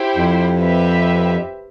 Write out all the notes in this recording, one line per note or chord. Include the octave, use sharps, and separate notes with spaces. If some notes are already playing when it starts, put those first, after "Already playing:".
Already playing: E4 G4 C5
F2
C4 G4 B4 E5